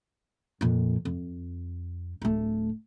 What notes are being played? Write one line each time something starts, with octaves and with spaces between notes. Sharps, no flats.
F2 A#2
F2
D1 A3